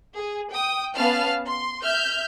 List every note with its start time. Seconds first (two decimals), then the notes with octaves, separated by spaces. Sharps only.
0.17 G#4
0.52 G5 D#6
0.96 B3 C#4 F5 A5 F6
1.46 C6
1.83 E5 F6 G6